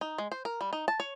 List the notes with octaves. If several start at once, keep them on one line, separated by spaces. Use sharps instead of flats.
D#4
G#3
C5
A#4
G3
D#4
A5
C#5